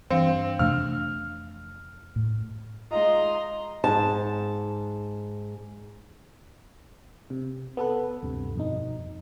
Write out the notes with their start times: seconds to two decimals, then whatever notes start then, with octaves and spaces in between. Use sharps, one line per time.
0.10 G2 E3 C4 F5
0.59 F2 C3 A3 D4 F6
2.16 A2
2.91 G#3 D#4 F4 D#5 A#5 C6
3.84 G#2 A5
7.30 C3
7.77 B3 A4 B4
8.22 D2 G2 C3
8.55 F2 B2 D#4